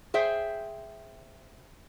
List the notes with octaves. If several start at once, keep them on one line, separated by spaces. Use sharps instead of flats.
G#4 C5 E5 G5